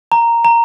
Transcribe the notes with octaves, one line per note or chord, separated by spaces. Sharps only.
A#5
A#5